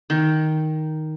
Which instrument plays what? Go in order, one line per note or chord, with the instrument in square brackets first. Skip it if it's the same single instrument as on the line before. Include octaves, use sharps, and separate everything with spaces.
[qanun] D#3